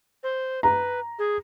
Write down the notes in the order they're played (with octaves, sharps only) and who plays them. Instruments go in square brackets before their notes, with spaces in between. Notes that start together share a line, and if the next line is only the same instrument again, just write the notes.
[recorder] C5
[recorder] B4 [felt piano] A#5
[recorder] G#4